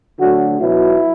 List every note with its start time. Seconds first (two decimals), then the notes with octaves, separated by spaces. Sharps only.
0.19 D2 D3 F#3 F#4
0.59 B1 B2 F#3 E4